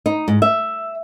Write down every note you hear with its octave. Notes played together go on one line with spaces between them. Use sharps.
D#4
G#2
E5